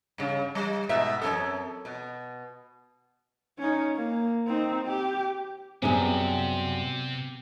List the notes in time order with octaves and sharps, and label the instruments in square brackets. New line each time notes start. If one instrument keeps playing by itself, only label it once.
[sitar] G2 C#3
G3
G#2 B2 E5
F#2 C4 A4
B2
[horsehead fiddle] C#4 D#4
A#3
C4 D#4
G4
[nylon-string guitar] F#2 G3 G#4 [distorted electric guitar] C3 [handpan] B3 C4